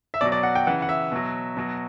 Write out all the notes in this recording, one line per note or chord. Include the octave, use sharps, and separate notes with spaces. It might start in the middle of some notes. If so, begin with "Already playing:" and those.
E5
B2 F#3 D5
D5
F#5
G5
C#3 E3 F#5
F#5
E5
B2 F#3
B2 F#3